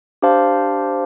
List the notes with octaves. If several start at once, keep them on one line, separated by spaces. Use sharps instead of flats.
D4 G4 C5 F5 A5